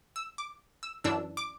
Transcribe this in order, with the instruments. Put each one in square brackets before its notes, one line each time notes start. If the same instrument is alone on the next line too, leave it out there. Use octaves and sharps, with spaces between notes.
[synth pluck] E6
D6
E6
F#2 E3 D4 E6
D6